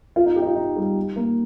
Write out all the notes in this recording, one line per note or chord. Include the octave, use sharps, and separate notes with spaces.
F4
D#4
G4
D#4
F4
D#4
G3
A#3